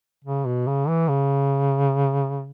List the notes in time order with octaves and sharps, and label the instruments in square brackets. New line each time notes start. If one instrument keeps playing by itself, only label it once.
[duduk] C#3
B2
C#3
E3
C#3